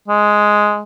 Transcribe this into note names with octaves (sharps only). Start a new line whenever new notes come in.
G#3